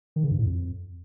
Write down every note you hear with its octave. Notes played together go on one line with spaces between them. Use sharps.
D#3
C#3
G2
A2
F2